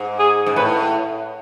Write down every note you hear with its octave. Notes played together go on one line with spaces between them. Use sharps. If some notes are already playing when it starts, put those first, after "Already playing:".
Already playing: G#2
G#4
G#2
A2 B4